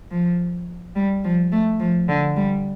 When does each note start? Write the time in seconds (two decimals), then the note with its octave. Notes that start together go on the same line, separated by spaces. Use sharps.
0.11 F3
0.95 G3
1.24 F3
1.52 A3
1.80 F3
2.08 D3
2.36 G3